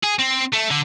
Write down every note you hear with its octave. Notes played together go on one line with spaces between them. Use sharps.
G#4
C4
A3
D3